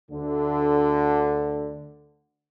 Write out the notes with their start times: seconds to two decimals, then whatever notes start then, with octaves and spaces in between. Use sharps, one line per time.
0.11 D2 D3